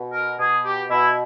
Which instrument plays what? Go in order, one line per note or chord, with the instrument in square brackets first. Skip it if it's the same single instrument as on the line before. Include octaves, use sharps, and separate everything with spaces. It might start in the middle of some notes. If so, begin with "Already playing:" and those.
Already playing: [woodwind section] B2
A#4
B2 G#4
G4
B2 E4